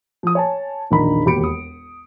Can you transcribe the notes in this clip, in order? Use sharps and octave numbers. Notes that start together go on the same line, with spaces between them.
F3 D#6
C#5 G#5 A5
E1 A#1 D#3 D4 A#5 B5
E1 D#2 G4 B5 C#7 D7
D#6